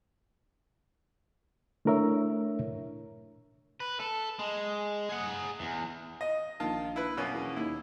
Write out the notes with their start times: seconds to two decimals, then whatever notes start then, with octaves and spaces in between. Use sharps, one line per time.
1.85 A3 D4 E4 A#4 C#5 E5
3.80 B4
4.00 A4
4.39 G#3
5.09 G#4 F#5
5.60 E2
6.21 D#5
6.60 A#1 D#3 F4 A5
6.96 E4 B4
7.17 F#2 B2 A#3 C#4
7.33 E2
7.56 D#2 E4